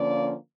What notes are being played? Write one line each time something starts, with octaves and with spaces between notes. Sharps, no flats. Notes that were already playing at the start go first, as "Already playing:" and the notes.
Already playing: D3 F3 A#3 C#4 D5